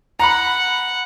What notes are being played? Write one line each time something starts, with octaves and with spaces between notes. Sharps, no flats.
F#5 A#5 B5